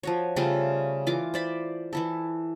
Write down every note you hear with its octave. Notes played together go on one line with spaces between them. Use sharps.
F3 F#4 C#5
C#3 G3 A3 F4
E3 F4 D6
C5 D5 B5
E3 E4 A4